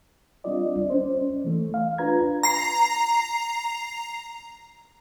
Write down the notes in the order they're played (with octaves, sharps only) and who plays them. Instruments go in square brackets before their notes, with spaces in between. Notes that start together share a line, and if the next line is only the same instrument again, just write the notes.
[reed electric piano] G3 C4 D4 F4 D5 D#5
C#4 C5
E3 A3
F5
D4 F4 B4 A#5 G#6
[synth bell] A#5 C7